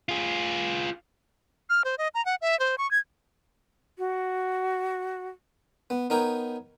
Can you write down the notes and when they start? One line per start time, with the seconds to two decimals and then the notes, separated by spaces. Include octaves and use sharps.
0.09 F4 G#4
1.70 F6
1.85 C5
1.98 D#5
2.14 A#5
2.26 F#5
2.42 E5
2.60 C5
2.78 C#6
2.91 G#6
3.99 F#4
5.90 B3
6.10 B3 D#4 A#4 C#5 G5